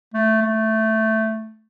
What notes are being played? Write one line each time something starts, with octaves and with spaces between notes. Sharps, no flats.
A3
A3